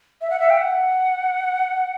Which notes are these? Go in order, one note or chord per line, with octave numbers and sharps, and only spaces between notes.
E5
F#5
E5
G5
F#5